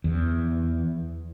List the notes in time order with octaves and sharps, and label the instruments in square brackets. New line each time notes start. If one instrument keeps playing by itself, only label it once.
[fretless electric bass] E2